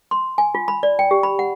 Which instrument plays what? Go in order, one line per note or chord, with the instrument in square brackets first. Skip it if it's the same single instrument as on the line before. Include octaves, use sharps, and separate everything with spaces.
[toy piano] C6
G#5
F4
B5
D5
G5
G4
B5
F#5